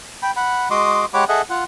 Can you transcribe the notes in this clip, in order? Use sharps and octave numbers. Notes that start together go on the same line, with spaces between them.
G5 B5
F#5 B5
G#3 F#4 D#5 C6 D6 D#6
G#3 G4 C#5 F#5 B5 D6
G#4 A4 D#5 E5 F#5
F4 F#5